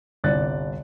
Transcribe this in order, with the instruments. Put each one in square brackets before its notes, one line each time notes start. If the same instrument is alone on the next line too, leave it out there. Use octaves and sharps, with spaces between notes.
[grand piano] G1 C2 G2 D5 F#6 A6